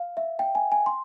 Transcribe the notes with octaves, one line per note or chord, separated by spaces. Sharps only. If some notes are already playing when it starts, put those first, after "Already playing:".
Already playing: F5
E5
G5
G#5
G#5
C6